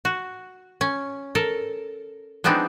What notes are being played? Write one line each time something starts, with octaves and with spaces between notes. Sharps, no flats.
F#4
C#4
A4 A#4
F3 G#3 B3 C4 D4 D#4